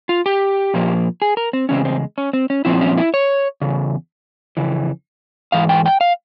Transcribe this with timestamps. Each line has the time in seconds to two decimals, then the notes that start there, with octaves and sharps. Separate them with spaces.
0.09 F4
0.26 G4
0.74 A#2 F3 A#3
1.22 G#4
1.37 A#4
1.53 C4
1.69 E2 C#3 G#3 C4 C#4
1.85 C4
2.18 C#4
2.33 C4
2.50 C#4
2.65 A#2 F3 C4 E4
2.81 C#4
2.97 E4
3.14 C#5
3.61 E2 C#3
4.57 F2 C#3 E3
5.52 G#2 E3 F5
5.69 G5
5.85 G5
6.01 F5